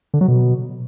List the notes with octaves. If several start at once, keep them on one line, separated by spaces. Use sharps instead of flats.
D3
F#3
B2